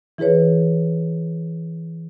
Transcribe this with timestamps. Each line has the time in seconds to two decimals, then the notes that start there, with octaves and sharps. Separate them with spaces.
0.18 E3 E4 G#4 B4 C#5